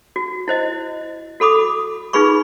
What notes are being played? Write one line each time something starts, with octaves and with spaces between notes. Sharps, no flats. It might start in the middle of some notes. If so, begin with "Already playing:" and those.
F#4
E4 C5 D#5
F#4 A4 B5 D6 D#6
D#4 F4 G#4 B4 B5 C#6